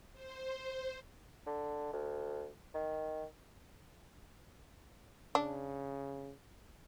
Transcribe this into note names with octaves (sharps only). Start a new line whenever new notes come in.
C5
D3
D2
D#3
C#3 D4